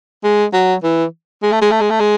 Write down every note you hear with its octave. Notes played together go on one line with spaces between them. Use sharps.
G#3
F#3
E3
G#3
A3
G#3
A3
G#3
A3
G#3